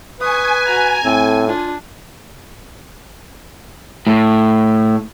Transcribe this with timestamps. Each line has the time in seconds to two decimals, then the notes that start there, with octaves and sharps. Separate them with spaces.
0.20 B4 G#5 C#6 D#6
0.66 F#4 A#5
1.05 A2 C4 A4
1.48 D4 F4
4.07 A2